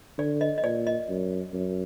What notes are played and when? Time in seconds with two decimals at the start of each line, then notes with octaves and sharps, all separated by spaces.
0.19 D3 D5
0.41 D#5
0.58 D#5
0.64 A#2 D5
0.87 D#5
1.09 F#2
1.53 F#2